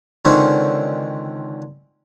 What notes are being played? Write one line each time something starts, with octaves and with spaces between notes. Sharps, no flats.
C#2 D3 D#3 C4 C#4